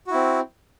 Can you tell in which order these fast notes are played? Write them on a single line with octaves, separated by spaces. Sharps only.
F#4 E4 C4